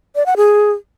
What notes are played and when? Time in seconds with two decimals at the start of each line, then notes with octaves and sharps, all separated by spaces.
0.16 D5
0.26 F#5
0.37 G#4